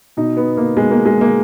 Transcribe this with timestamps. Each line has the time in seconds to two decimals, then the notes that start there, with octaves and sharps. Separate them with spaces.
0.17 B2 D#4
0.37 B3
0.57 A#3
0.77 B2 G#3
0.91 A#3
1.06 G#3
1.21 A#3